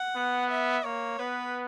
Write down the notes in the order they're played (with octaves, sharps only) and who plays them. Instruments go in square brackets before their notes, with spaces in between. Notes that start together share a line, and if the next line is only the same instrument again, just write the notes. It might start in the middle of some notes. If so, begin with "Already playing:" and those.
Already playing: [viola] F#5
[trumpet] B3
[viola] E5
[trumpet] A#3 [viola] C#5
[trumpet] B3 [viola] B4